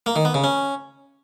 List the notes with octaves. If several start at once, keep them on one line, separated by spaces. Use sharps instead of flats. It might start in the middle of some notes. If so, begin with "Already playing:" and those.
A#3
D#3
B3
C#3
C#4